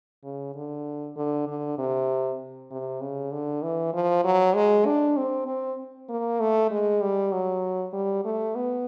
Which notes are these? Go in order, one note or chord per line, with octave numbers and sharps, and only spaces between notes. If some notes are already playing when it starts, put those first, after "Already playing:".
C#3
D3
D3
D3
C3
C3
C#3
D3
E3
F3
F#3
G#3
D4
C4
C4
A#3
A3
G#3
G3
F#3
G3
A3
B3